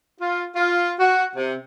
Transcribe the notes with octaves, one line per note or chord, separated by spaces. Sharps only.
F4
F4
F#4
C3